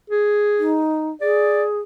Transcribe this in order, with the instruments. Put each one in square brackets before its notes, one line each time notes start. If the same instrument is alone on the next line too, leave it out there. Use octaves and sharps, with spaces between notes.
[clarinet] G#4
[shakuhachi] D#4
[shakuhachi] G#4 [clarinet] D5